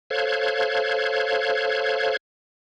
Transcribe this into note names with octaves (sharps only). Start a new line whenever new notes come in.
A4 C5 C#5 F5 F#6 G#6